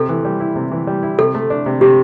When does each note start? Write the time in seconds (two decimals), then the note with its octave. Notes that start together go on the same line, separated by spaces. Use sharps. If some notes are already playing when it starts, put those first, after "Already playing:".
Already playing: C3 A4
0.09 E3
0.25 G3
0.40 E4
0.56 C3
0.72 E3
0.87 G3
1.03 E4
1.19 C3 A4
1.35 A3
1.50 D4
1.66 C3
1.81 C3 G4